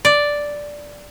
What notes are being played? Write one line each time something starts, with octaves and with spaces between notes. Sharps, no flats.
D5